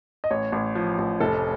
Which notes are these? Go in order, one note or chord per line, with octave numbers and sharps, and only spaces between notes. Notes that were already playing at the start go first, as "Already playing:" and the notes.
D#5
A1 C#5
A1
F3
A1
F1 A4